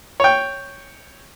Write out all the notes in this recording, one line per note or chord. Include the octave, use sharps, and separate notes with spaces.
C#5 G5